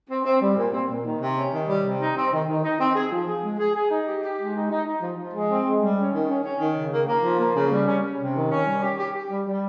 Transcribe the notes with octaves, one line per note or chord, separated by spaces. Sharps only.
C4
C4
G3
A#2
C4
A#2
D#3
C3
C#4
D#3
G3
C3
D#4
C4
D#3
D#3
D#4
C4
G#4
F3
G#4
G#3
G#4
G#4
D#4
G4
G4
G#3
D#4
D#4
D#4
F3
F3
G#3
C4
G#3
G3
C#4
D#3
C#4
C#4
D#3
C#3
A#3
A#3
F3
A#3
C#3
G3
C#4
C#4
C3
D#3
C#4
G3
G4
G4
G4
G3
G3